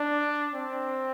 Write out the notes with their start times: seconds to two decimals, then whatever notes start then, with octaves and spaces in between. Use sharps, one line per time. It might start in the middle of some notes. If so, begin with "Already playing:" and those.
Already playing: D4
0.54 C4